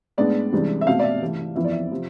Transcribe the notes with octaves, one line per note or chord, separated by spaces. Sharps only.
A2 G#3 B3 D4 D5
C2 C3 E3 G#3 D4
E5
B2 A3 C4 F5
D5
E5
C3 E3 A3
F2 E3 B3 E4 E5
D5
E5
C3 F3